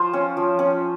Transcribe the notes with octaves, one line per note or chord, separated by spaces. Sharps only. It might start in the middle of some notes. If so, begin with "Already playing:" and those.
Already playing: F3 F4 C5
C#4
F3
C#4